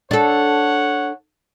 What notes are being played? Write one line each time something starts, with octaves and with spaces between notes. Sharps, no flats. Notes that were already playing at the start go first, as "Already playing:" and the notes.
D4 A4 C#5 F#5